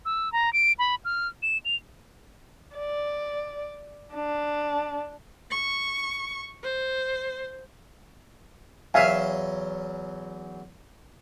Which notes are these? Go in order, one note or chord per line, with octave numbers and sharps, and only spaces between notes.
E6
A#5
D7
B5
F6
E7
F7
D5
D4
C#6
C5
E2 F#3 C#4 E5 F5 G#5